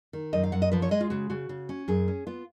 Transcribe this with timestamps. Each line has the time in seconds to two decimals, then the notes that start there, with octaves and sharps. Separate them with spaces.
0.13 D#3
0.33 F#2 D#5
0.44 F5
0.52 F#2 F#5
0.62 D#5
0.72 F3 B4
0.82 C#5
0.91 G#3 D#5
1.01 F4
1.10 C#3 F#4
1.30 C#3 F#4
1.49 C#3
1.69 C#4
1.88 F#2 G#4
2.08 C#4
2.27 B3 F4